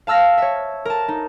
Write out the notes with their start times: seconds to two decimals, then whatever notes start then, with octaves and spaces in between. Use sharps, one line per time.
0.07 F5 A5 E6 F6 A#6
0.38 C#5 E5
0.85 A#4 A5
1.08 D#4